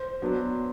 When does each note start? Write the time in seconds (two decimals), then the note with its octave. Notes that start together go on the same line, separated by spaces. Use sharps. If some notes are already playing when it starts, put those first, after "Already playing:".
Already playing: C5
0.22 F#3 B3 D4